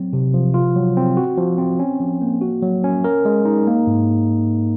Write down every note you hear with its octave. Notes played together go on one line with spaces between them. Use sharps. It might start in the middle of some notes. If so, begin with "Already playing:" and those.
Already playing: F#3 C4
C3
F3
F4
F#3
C4
F#4
F3
C4
C#4
F3
A#3
F#4
F#3
C#4
A#4
G#3
D#4
A#3
G#2